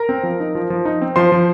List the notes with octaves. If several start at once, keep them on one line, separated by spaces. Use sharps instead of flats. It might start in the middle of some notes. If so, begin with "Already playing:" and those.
Already playing: A#4 A#5
C4
F3
D#4
F3
F3
D#4
C4
F3 C5 C6
F3